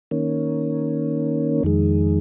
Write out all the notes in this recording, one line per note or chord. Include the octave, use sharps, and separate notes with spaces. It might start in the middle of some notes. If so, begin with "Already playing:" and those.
D#3 A#3 C#4
F2 D#3 G#3